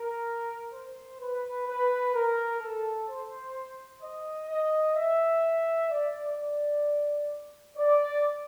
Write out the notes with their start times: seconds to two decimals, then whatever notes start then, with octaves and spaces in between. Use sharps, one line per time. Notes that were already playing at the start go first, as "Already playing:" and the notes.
Already playing: A#4
0.73 C5
1.20 B4
1.68 B4
2.14 A#4
2.60 A4
3.08 C5
4.01 D#5
4.49 D#5
4.96 E5
5.90 D5
6.36 D5
7.77 D5